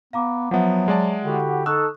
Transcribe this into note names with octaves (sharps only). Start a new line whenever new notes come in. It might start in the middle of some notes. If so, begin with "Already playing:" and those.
B3 F5 A#5 D6
F3 F#3 B3 E5 F#5
G#3 D5 A5
D3 E4 F#4 G4
D#4 A4 C#6 D#6 E6 F#6